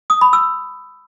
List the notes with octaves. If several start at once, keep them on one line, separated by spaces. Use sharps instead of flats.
D#6
B5
E6